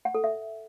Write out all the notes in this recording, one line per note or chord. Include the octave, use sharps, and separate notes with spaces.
F#5
A4
E5